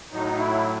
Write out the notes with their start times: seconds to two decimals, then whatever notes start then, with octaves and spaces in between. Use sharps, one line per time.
0.12 A2 F#3 D#4
0.38 E4